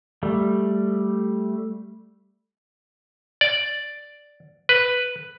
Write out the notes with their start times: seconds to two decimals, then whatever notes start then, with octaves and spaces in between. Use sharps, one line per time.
0.23 G3 A3
3.41 D5
4.69 B4